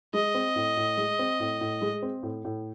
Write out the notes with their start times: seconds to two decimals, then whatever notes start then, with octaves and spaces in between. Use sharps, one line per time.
0.13 G#3 D#5
0.34 C4
0.56 A2
0.77 A2
0.97 G#3
1.19 C4
1.40 A2
1.61 A2
1.82 G#3
2.02 C4
2.23 A2
2.45 A2